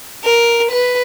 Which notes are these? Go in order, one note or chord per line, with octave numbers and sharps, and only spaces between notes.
A#4
B4